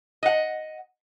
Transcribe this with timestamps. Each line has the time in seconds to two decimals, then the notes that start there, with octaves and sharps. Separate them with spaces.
0.23 D#5 F#5